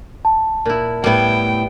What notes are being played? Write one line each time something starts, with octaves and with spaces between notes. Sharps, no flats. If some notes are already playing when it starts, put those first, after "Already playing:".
A5
A#2 E4
A2 G3 B3 E4 G5